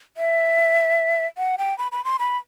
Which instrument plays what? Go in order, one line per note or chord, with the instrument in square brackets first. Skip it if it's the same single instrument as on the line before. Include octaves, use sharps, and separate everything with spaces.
[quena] E5
F#5
G5
B5
B5
C6
B5